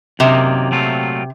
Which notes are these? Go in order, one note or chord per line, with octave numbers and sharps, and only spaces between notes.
F#2 C3 D#3 A#3 D#4
A#2 F#3 A3 C4 F4